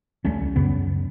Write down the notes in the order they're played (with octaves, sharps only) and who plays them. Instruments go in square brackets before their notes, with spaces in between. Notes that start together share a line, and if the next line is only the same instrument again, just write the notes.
[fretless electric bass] C#2 G3 A3 C#4
F#2 C#3 B3